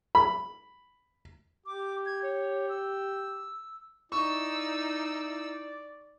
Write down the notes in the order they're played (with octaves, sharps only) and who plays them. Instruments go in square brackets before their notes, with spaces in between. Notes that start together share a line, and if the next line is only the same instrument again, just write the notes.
[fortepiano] B5
[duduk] G4 [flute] D6
[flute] G#6
C#5
E6
[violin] D#4 E6 [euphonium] E4 [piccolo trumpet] D5 [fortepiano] C#6